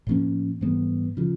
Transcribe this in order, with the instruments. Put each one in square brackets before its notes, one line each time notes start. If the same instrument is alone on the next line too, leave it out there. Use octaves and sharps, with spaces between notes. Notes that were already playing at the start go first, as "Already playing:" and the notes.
[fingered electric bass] A2 F3 A#3 C#4
G#2 E3 G3 B3
C#3 F3